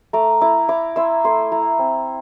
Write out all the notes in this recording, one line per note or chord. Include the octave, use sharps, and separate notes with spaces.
A3 A#5 D6
E4 A#5 D6
E4 A#5 D6
E4 C6 E6
A3 C6 E6
E4 A#5 D6
C4